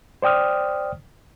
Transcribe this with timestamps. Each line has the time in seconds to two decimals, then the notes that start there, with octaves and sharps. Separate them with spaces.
0.22 C5 D5 G5 D#6 F6